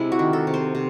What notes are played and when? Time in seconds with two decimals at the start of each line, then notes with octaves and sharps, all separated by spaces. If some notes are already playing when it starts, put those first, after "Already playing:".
Already playing: C3 G#3 E4
0.12 F#4
0.19 D#3
0.33 A4
0.47 C3
0.54 C5
0.75 C3